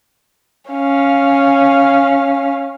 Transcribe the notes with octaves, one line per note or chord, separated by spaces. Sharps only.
C#4 F5